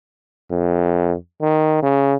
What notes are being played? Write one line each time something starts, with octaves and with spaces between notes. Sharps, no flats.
F2
D#3
C#3